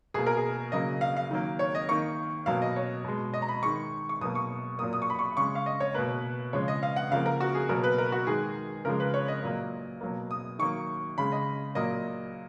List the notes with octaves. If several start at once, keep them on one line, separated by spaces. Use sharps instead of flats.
B2 A#3 G#4
A#4
G#4
C#3 F#3 A#3 D#5
F5
F5
D#3 F#3 A#3
C#5
D#5
D#3 A#3 C#6
B2 F#3 A#3 F5
D#5
C#5
B2 G#3
D#5
A#5
B5
D#3 G#3 C#6
C#6
B2 F#3 A#3 D#6
C#6
A#2 F#3 A#3 D#6
D#6
C#6
B5
C#6
C#3 G#3 C#6
F5
D#5
C#5
B2 A#3 B4
C#3 F3 G#3 C#5
D#5
F5
F#5
C#3 F3 A#3 F5
A#4
F#4
G#4
B2 F#3 A#3 A#4
B4
A#4
F#4
D#3 G#3 G#4
C#3 F3 G#3 A#4
B4
C#5
D#5
A#2 F#3 A#3
B2 F#3 A#3
D#6
D#3 F#3 A#3 C#6
C#3 G#3 B5
D#5
A#2 F#3 A#3 D#5